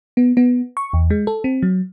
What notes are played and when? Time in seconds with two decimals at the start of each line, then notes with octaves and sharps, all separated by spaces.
0.17 B3
0.37 B3
0.77 C#6
0.93 E2
1.10 G#3
1.27 A4
1.44 C4
1.63 F#3